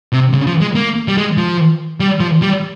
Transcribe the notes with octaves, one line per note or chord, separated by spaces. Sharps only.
C3
C#3
F3
G#3
A#3
G3
G#3
F3
G3
F3
G3